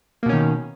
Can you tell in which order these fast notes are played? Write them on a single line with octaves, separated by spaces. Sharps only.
A#3 B2 C#4 D#3